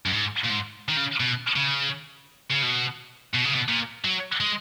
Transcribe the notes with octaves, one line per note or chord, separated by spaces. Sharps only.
F#2
G#2
A#2
G#2
D#3
C#3
B2
C#3
C#3
B2
B2
C#3
B2
A#2
F#3
G#3